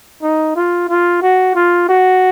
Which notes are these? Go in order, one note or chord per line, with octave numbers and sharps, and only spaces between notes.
D#4
F4
F4
F#4
F4
F#4